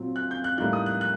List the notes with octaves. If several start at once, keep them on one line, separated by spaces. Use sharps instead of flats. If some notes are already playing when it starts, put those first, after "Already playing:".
Already playing: A#2 F#3 C4
F#6
G6
F#6
A2 G3 A#3 D#4 F#6
D#6
F#6
F#6